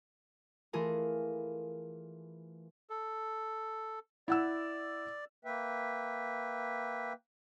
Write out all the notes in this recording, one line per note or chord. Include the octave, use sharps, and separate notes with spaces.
E3 A3 F4 G#4 A#4
A4
E4 D5 F#5 E6
A#3 B4 E5 G5